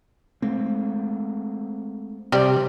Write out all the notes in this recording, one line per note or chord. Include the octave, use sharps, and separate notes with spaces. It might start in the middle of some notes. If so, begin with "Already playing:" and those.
G#3 A3 C4
C3 G3 D5